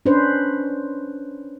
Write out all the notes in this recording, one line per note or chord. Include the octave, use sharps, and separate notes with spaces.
C#4 D4 B4 C5